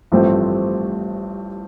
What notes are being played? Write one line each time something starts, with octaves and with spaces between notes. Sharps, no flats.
A1 G2 F3 A3 C4